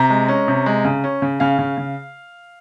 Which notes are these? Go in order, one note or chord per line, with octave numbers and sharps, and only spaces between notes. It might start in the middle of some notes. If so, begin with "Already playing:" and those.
Already playing: C3 A#5
G#3
C#4
C3
G#3
C#3
C#4
C#3
C#3 F5
C#3
C#3